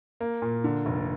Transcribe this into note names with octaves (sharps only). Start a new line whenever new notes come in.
A#3
A#2
D3
F1